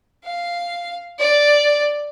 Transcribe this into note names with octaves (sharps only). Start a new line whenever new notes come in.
F5
D5